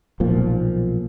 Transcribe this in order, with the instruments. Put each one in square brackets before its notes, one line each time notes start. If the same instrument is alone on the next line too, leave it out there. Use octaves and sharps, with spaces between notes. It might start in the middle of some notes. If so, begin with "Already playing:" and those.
[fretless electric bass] B1 A#2 F3